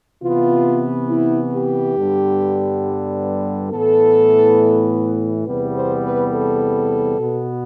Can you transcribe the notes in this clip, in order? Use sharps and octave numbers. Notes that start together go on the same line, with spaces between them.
C3 E3 B3 F4
E4
G4
G2 D3 G3 B3
A2 E3 B3 A4
E2 C3 G3 B3 B4
C5
B4
A4
B2 B3